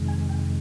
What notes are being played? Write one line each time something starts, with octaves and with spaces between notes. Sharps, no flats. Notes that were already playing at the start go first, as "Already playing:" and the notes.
Already playing: F2 C3 D#3 G#3
G#5
G5